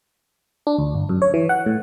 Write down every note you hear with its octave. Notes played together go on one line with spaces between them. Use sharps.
D4
D2
G1
F#2
C#5
E3
F#5
A2